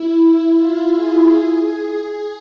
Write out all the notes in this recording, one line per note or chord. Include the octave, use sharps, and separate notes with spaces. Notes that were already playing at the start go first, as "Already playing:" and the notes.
Already playing: E4
F4
G#4
G#4
G#4